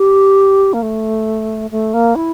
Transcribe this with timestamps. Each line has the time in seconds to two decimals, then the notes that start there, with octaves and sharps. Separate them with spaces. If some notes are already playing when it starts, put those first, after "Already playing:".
Already playing: G4
0.73 A#3
0.82 A3
1.71 A3
1.94 A#3
2.16 E4